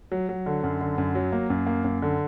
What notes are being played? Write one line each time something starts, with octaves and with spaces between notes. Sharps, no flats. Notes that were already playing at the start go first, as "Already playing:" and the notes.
F#3
F#3
D3
F#2
D3
F#2
F#3
A#3
F#2
A#3
F#2
D3